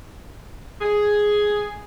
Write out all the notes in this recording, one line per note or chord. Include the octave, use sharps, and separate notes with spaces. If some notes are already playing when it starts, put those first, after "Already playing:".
G#4